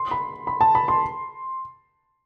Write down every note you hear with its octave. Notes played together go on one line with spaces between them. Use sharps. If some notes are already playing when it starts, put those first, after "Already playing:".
Already playing: C6
B5
B5
A5
B5
C6